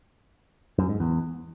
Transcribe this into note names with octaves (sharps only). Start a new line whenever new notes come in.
F#2
G#2
E2